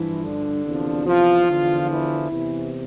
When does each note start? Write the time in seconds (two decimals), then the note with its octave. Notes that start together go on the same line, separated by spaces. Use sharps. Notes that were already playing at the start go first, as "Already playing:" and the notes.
Already playing: G2 E3 F3 E4
0.23 D3 D4
0.64 E2 C3 F3
1.06 F3 F4
1.48 E2 D3 F3
1.89 E3 E4
2.31 E2 C3 E3